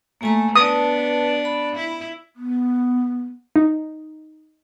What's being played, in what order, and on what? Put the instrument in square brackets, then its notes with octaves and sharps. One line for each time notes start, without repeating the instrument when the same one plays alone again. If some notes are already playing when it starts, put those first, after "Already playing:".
[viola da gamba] A3 [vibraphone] A#3 G#5 A#5
[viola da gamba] B3 D4 [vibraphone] B4 A5 [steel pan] D#6
[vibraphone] B5
[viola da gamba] E4
[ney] B3
[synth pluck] D#4